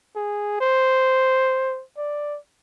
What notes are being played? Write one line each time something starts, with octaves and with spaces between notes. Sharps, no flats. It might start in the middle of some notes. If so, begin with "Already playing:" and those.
G#4
C5
D5